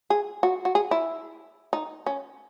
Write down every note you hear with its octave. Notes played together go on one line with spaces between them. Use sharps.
G#4
F#4
F#4
G#4
E4
D#4
C#4